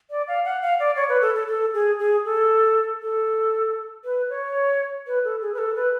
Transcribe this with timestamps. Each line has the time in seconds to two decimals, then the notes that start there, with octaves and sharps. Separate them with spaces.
0.11 D5
0.28 F5
0.45 F#5
0.62 F5
0.79 D5
0.96 C#5
1.09 B4
1.22 A4
1.35 A4
1.48 A4
1.74 G#4
1.99 G#4
2.25 A4
3.02 A4
4.04 B4
4.30 C#5
5.07 B4
5.25 A4
5.41 G#4
5.54 B4
5.58 A4
5.75 B4